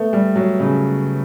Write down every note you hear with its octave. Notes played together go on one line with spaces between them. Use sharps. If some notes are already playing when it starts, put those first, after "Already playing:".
Already playing: A3 B3
G3
F#3
C#3